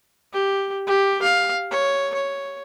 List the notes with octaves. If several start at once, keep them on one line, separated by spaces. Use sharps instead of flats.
G4
G4
F5
C#5
C#5